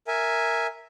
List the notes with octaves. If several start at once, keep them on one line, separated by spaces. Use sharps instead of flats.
A#4 E5 G#5